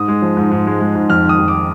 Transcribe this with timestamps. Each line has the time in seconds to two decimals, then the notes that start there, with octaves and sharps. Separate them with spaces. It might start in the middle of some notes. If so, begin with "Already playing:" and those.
Already playing: G#2 D#6
0.08 G#3
0.22 F3
0.37 G#2
0.51 G#2
0.67 G#3
0.80 G#3
0.95 G#2
1.09 F2 F6
1.25 D#3 D#6
1.39 F2
1.48 D6
1.54 G#3